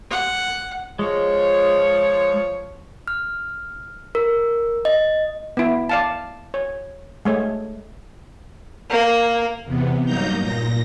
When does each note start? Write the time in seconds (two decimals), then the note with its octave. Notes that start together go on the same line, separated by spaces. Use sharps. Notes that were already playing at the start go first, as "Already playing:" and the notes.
0.11 F#5
0.99 F3 G#3 C#5
3.08 F6
4.15 A#4
4.85 D#5
5.57 B3 E4
5.89 D5 F5 A5
6.54 C#5
7.25 G#3 A3 C#5
8.90 A#3
9.64 E2 C3 B3
10.05 G2 F#3 A#3 D#4 A#5 G6
10.39 A#2 A#6